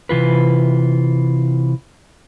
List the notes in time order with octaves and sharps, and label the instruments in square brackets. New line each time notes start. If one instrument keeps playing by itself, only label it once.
[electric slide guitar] C3 E3 F4 B4